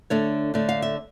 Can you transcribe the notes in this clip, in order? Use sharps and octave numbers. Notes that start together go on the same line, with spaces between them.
D3 A3 D4 C#5
D3 A3 D4
F5
E5